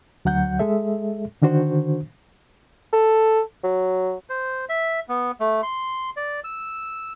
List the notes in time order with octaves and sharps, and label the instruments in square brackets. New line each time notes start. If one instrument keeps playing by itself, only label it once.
[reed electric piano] D2 F#3 F#5 G6
G#3 G#4 A4 E5
D3 D#3 D4 F#4 C5
[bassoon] A4
F#3
[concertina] C5
E5
B3
A3
C6
D5
E6